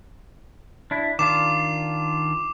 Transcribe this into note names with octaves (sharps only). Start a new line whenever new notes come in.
D4 E4
D#3 D4 F4 D6 E7